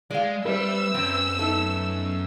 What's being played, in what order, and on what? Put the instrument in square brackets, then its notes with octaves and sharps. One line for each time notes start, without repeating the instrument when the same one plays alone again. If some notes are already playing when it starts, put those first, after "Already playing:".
[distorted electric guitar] G#3 [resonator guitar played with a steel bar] D5 F5
[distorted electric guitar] G3 [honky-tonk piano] B4 C5 E5 [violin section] E6
[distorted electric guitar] F#2 [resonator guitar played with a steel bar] C4
[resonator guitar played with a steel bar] A3 [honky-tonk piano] B3 D#4